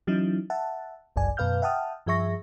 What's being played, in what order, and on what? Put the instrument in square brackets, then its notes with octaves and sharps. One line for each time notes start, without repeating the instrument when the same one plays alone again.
[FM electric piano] E3 F#3 C#4 D#4 E4
E5 F#5 A5
G1 C2 F#2 D5 G#5
F#2 B2 B4 F5 F6 G6
E5 F#5 G5 A5 D#6 F6
G2 F3 G#4 E5 C#6 A#6